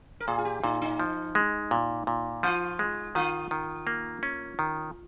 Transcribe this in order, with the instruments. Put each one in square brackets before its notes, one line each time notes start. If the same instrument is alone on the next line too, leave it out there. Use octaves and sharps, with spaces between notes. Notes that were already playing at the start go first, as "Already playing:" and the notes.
[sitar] A#4
[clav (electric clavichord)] A#2 [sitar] G#4
[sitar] F4
G4
[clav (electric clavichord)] A#2 [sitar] D#4
[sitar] D#4
[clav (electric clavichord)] F3
G#3
A#2
A#2
[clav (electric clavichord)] F3 [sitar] F4
[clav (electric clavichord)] G#3
[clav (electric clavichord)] D#3 [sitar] F4
[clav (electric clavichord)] D#3
A#3
C#4
D#3